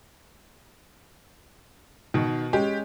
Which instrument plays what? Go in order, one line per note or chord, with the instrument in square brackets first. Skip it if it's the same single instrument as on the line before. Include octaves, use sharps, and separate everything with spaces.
[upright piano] B2 [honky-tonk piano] D#3
[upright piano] G#3 C#4 [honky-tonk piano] G4